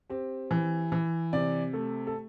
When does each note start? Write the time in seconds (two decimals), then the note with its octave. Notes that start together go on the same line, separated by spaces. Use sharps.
0.10 C4 G4
0.51 E3
0.92 E3
1.33 C3 D5
1.73 A3 A4
2.07 A4